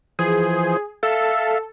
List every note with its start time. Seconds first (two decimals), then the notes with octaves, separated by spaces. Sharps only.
0.19 E3 F3 G#4 C5
1.03 A4 E5 F5